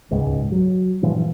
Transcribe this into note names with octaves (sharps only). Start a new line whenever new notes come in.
D#1 C#2 G#2
F#3
G2 A#2 E3 F3